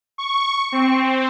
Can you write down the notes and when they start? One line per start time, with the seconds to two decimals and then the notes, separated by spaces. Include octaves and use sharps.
0.18 C#6
0.72 C4